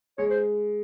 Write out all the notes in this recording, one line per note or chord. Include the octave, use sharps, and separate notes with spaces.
G#3 C#5
C5